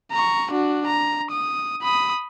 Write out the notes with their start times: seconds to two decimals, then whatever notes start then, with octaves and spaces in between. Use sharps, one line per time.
0.12 A#5 C#6
0.51 D4 F#4
0.87 A#5
1.31 D#6
1.83 B5 D#6